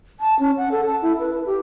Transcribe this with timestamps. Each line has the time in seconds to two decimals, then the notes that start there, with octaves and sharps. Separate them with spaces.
0.20 A5
0.39 C#4
0.57 F#5
0.71 A4
0.87 A5
1.02 E4
1.20 B4
1.46 G4